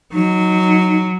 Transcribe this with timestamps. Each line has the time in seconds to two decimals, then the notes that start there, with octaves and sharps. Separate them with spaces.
0.13 F#3 D#4